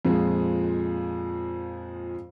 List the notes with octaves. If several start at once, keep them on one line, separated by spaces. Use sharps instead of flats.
F2 A#2 F3 G#3